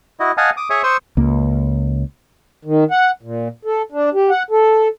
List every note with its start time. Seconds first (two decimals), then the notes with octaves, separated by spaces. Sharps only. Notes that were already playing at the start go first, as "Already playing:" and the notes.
0.20 E4 F#4 D#5
0.37 D#5 F5 F#5 G#5 A5 D#6
0.57 D6 D#6
0.70 G#4 C#5 E5 C#6 D#6
0.84 C5 C6 C#6 D#6 E6
1.17 C#2 A#3
2.65 D#3
2.91 F#5
3.23 A#2
3.65 A4
3.92 D4
4.14 G4
4.30 F#5
4.50 A4